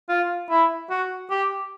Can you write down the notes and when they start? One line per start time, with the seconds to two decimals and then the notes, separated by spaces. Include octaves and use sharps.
0.09 F4
0.50 E4
0.90 F#4
1.30 G4